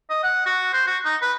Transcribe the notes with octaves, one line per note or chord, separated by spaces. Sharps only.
D#5
F#5
F#4
C5
F#4
D#4
B4